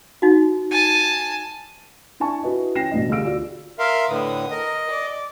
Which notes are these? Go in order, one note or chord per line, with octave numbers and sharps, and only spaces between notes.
D#4 F#4
G#5 A5
D4 E4 G#5 A5 C#6
E4 F#4 B4 D#5
E3 C#4 G5 A#6 C7 E7
A1 B2 D4 D#5
D2 G4 G#4 F5 E6 D7
F4 F#4 D5
A#4 E5 F5 C6
A2 D3 B4 D#6
A#4 D#5
D5